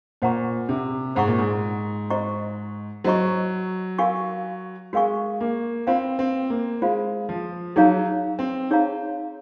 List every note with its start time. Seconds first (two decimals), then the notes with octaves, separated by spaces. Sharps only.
0.22 A#2 C5 F#5 A#5 C#6
0.69 C3
1.16 G#2 C5 F#5 A#5 C#6
1.27 A#2
1.38 G#2
2.10 F#4 C5 D#5 A#5 C#6
3.04 F#3 F#4 C5 D#5 A#5 C#6
3.98 F#4 A#4 F5 G#5 C#6
4.93 G#3 F#4 A#4 F5 G#5 C#6
5.41 A#3
5.87 C4 F4 C5 F5
6.19 C4
6.50 A#3
6.82 G#3 F4 C5 F5
7.29 F3
7.76 F#3 D#4 G#4 C#5 F5 A#5
8.39 C4
8.70 D#4 G#4 C#5 F5 A#5